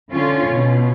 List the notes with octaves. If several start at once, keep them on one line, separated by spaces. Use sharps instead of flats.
D3 C#4 F4
B2